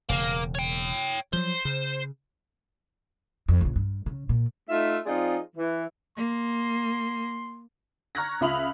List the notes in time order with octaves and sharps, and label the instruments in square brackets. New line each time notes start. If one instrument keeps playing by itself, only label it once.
[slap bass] E1 C#3 [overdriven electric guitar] A#3
[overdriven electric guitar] C#5 G5
[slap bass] F3 F#3 [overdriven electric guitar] C5
[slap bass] C#3
[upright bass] F2
A#1 C#3
G2
C#3
A#2
[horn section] A3 D#4 F4 E5
F3 C4 D#4 F4 G#4 D5
E3
[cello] A#3 [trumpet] C6
[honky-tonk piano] A#5 C#6 F6 F#6 G#6 A#6
C#2 F4 E5 B5 D#6 F7